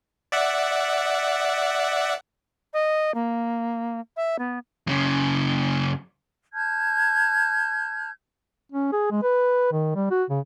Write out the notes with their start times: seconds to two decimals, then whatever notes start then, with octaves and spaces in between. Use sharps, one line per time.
0.32 D5 E5 F#5
2.73 D#5
3.14 A#3
4.17 E5
4.39 B3
4.87 F#2 C#3
6.53 A5 F6 G6 G#6
8.72 C#4
8.92 G#4
9.11 G#3
9.23 B4
9.72 D#3
9.95 G3
10.11 F#4
10.30 C#3